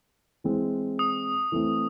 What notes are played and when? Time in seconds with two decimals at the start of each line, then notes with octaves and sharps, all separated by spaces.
0.44 E3 G#3 C4
0.99 D#6
1.52 E3 A3 C4